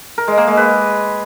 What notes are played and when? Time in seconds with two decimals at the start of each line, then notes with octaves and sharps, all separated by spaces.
0.18 A#4
0.28 G#3
0.38 A#3
0.47 G#3
0.57 B4